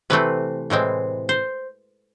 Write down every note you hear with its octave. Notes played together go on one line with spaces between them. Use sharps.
C3 E3 A3 C4 B4
A2 E3 G#3 C4
C5